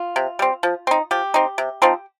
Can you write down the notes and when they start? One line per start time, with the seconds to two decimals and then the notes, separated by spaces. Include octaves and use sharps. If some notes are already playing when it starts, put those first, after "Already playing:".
Already playing: F4
0.16 C3
0.39 G3 C4
0.63 F3
0.87 C4 D#4
1.11 F3 G4
1.34 C4 D#4
1.58 C3
1.82 F3 C4 D#4